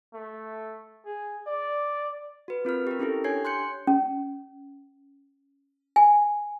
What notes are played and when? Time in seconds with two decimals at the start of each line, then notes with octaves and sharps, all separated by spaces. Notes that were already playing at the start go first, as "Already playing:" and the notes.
0.14 A3
1.06 G#4
1.47 D5
2.48 F#4 B4
2.65 C4 F4 A#4 F6
2.87 G4 A#4
2.99 C#4 E4 G4 A4
3.24 D4 G4 C#5 G#5 G#6 C7
3.45 C6 F#6 G6 C#7
3.87 C#4
5.96 G#5